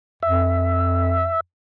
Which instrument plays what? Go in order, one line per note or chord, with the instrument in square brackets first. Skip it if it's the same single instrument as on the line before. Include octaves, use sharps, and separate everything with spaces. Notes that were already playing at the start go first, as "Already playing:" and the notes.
[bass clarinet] F2 [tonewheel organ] E5